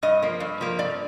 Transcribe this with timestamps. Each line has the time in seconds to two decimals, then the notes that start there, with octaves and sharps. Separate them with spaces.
0.03 G2 D#5
0.22 F3 A#3
0.40 G2
0.61 F3 A#3
0.79 G2 D5